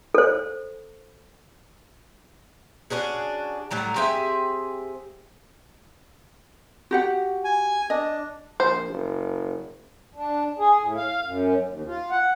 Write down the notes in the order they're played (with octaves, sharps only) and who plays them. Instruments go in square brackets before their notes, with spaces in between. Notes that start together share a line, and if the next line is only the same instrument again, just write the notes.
[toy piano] A4 C5
[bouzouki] C#4 D4 F#4 G#4
A2 F#3 G3 A#5
C4 G4 G#4 E5
[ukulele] F#4 G4 F#5
[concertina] G#5
[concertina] D4 [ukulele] D#5
[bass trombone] A#1 [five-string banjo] C5
[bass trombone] F#1
[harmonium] D4
G#4
A2
F5
F#2
D#2
F4
F#5